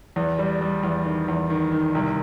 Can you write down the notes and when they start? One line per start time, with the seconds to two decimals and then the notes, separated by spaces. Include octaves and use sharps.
0.16 E2
0.39 G3
0.61 G3
0.83 E2
1.06 D#3
1.28 E2
1.50 D#3
1.72 D#3
1.95 C2